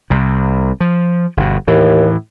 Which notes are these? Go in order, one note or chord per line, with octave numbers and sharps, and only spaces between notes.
C2 C3
F3
G1 B2
D#2 A2 E3